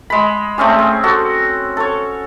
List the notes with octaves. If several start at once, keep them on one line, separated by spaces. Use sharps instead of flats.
G#3 B5
A3 C4 C#4 G#4
G#4
F#4 A4
A4 C#5